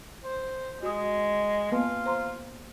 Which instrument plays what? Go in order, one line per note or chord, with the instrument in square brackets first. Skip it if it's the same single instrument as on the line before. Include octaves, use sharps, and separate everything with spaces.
[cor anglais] C5
[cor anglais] G#3 [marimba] F#4 D#6
[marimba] A#3 B3 B4 [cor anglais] F4
[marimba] C5 A#5 C6